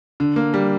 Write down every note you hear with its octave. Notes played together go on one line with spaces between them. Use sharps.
D3
A#3
G3